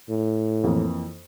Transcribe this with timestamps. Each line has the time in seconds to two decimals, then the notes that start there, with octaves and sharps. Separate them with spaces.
0.09 A2
0.64 F2 E3 A#3